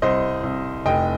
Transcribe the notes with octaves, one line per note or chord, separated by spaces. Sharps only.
C2 C5 D#5
C2
F1 D#5 G5